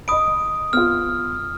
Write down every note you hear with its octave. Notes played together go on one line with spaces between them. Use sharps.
D#5 B5 D#6 D7
B3 F4 F6